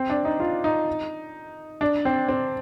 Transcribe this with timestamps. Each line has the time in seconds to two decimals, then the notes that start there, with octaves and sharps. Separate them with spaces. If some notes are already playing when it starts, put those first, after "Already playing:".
Already playing: C4
0.10 D4
0.25 D#4
0.40 F4
0.64 D#4
1.81 D4
2.05 C4
2.28 C4